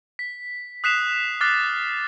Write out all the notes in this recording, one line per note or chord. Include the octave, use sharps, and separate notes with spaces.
B6
D#6 F#6 B6 C7 E7 F7
D6 F6 F#6 A6 C7